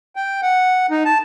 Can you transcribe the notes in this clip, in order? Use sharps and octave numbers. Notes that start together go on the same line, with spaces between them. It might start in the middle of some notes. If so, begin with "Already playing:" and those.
G5
F#5
D#4
A5